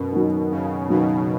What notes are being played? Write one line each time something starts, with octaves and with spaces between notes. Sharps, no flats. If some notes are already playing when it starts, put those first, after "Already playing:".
Already playing: F#2 B2
D#3 F#3
F#2 C#3
B2 D#3 F#3